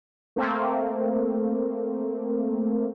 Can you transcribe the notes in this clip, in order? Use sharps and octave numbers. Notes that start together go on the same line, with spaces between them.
A3 A#3 C4